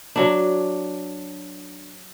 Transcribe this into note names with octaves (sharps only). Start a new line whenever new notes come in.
F#3 D4